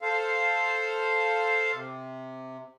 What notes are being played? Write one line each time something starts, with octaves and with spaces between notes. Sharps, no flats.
A4 C5 F5
C3